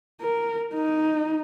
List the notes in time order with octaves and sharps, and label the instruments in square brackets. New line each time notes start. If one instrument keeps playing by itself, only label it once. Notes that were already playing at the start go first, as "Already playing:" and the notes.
[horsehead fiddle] A#4
D#4